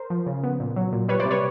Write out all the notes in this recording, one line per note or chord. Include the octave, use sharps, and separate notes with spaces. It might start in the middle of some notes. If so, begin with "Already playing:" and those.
Already playing: A#4 C5
F3
C#3
B3
A#2
F#3
A#2
G3 B4 C#5
C5 D5
C3
B4 C#5